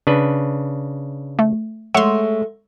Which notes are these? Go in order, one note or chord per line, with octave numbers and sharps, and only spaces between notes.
C#3 D4 B4
A3
G#3 A3 C#5 E5 F#5 C6